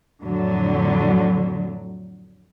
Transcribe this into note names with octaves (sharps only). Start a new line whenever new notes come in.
F2 A2 D3 F#3